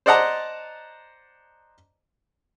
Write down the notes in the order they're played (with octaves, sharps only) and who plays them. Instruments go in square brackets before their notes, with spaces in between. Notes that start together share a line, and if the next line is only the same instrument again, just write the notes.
[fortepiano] C5 D5 D#5 F#5 A5 A#5